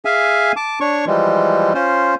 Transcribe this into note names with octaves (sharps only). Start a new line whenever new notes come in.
G#4 E5 F5 G#5
A5 D6
D4 C#5 C#6
E3 F3 G3 G#3
C#4 F4 C5